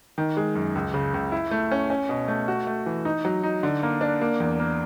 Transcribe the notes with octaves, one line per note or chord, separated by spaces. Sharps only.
D#3
G#3
F#2
C#2
C#3
C#2
E4
A3
C#4
C#4
B2
A3
F#4
A3
E3
D#4
F#3
D#4
D3
A#3
D4
A#3
E2
A#3